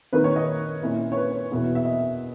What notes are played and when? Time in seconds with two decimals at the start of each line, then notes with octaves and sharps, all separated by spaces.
0.13 D#3 A#3 D#4 B4
0.24 C#5
0.36 D#5
0.82 A#2 A#3 C#4 E4
1.12 C#5
1.16 B4
1.51 E2 B2 A#3 E4
1.75 E5
1.85 D#5